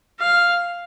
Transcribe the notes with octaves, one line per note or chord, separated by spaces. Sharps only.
F5